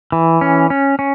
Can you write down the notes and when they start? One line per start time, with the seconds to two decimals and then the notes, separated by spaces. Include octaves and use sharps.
0.12 E3
0.41 C#4
0.70 C#4
0.99 C#4